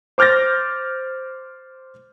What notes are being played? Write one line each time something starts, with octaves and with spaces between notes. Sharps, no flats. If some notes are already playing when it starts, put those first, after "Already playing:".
C5 D6 F6 G6 A6 A#6